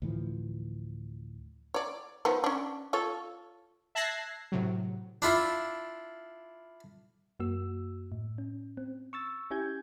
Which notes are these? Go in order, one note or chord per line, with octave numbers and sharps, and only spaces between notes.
D2 A2 E3 F3
C#5 D5
D#3 F3 B3
C#4 D4
F4 A4 C#5
E5 A5 F#6 G#6 A#6 C7
A2 C3 F#3
D4 E4 F4
F#2 A#3 F#4 E6
A2
C#4
C4
C#6 E6 A6
C#4 E4 G4 G#5 G6 G#6